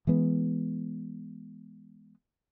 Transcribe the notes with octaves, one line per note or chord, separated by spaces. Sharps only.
E3 G#3 B3